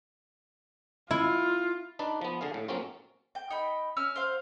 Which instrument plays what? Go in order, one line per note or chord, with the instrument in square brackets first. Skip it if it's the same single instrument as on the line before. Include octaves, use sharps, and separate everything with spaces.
[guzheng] E4 [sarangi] F4
[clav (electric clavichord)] D4 D#4 B4 D5
F3 B3
D3 G#4 F5
A2
F#3 A#3 C4 C#4 F4
[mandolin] G5
D#4 G5 B5
C#4 E6 F6
C5 F5